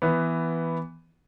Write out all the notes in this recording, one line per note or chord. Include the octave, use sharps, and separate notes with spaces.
E3 B3